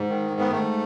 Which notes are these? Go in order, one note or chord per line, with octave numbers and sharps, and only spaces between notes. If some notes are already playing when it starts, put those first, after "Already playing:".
Already playing: G#2
D#3
G#2
B3
G#2 A3